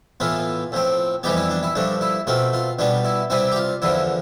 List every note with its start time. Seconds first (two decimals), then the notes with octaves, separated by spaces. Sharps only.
0.20 A2 E3 B3 F4
0.72 A2 F3 C4
1.23 F2 E3 G3 B3 G4
1.37 E4
1.50 D4
1.63 E4
1.75 G2 F3 A3 D4
2.01 E4
2.27 B2 A3 C4 F4
2.53 F4
2.79 B2 G3 B3 D4
3.05 E4
3.30 C3 G3 C4 E4
3.52 G4
3.56 F4
3.82 E2 D3 F3 E4